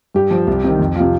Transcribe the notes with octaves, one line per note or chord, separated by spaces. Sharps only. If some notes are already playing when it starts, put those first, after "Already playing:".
G2 G4
F3
C2
C3 D#3
F2
C3 F3 F4